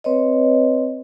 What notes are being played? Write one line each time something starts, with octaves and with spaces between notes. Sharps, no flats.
C4 B4 C#5 D#5